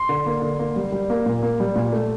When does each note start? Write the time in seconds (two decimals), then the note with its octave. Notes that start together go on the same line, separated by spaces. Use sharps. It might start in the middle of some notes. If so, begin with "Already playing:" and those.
Already playing: C6
0.09 D3
0.26 A#3
0.42 D3
0.59 A#3
0.76 G3
0.92 G3
1.10 A#3
1.26 A#2
1.43 A#3
1.60 G3
1.76 A#2
1.93 A3